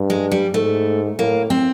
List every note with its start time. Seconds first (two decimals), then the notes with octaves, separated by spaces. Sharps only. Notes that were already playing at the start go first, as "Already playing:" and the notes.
Already playing: G2
0.10 G#3
0.32 G3
0.53 G#2 A3
1.19 A2 A#3
1.50 C4